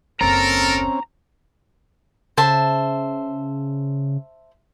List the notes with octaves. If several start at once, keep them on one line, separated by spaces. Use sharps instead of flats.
F#1 D#2 C4 C#4 A4 A#4 A#5
C#3 C5 E5 A5